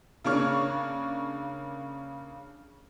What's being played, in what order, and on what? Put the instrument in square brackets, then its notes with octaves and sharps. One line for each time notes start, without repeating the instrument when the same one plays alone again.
[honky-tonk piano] C#3 A#3 D4 C#5 C#6 F6